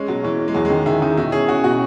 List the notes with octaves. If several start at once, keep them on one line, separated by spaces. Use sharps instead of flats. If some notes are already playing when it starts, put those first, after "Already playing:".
Already playing: G#3 C#4
B2 F#3
E3 C#4
C#4
G#3
E2 F#3
G#3
D#3
D#3 E4
D#3 D#4
B2 E4
C#4 G#4
C#4 F#4
B2 F#4